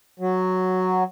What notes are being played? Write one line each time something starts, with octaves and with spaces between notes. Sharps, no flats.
F#3